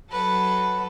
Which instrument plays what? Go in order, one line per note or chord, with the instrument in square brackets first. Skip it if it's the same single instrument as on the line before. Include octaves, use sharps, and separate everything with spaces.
[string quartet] F#3 A4 B4